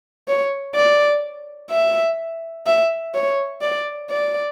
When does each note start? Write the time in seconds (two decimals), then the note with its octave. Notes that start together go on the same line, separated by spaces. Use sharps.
0.28 C#5
0.75 D5
1.71 E5
2.66 E5
3.15 C#5
3.62 D5
4.10 D5